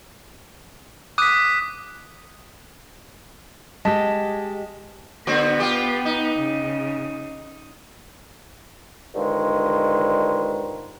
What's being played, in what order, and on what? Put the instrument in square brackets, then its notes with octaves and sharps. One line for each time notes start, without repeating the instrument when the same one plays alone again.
[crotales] D6 B6 [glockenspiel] D#6 F#6 D#7
[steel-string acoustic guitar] G#3 G4 [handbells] D#5 A5 B6
[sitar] D3 C4 F#4 [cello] B3
[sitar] F4 G4
D#4
[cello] C#3
[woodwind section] G2 D3 D#3 F3 G#3